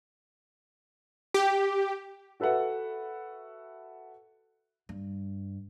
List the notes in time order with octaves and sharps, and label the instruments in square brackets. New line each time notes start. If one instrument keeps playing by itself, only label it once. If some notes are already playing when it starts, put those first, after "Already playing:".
[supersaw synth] G4
[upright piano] F#4 A4 B4 E5 F#5
[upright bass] G2